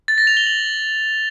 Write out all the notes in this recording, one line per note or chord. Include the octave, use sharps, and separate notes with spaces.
A6
A#6
F7
G7
F#7